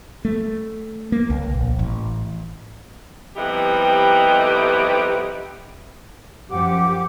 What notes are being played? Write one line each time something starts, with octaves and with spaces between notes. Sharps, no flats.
A3
A#3
C#2
A#1
A1
F2 G3 B3 D#4 E4 G4
F#2 F3 G4 F#5 D6